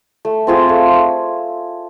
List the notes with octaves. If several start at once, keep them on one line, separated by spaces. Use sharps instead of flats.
A3
C4 F4 G#4
A3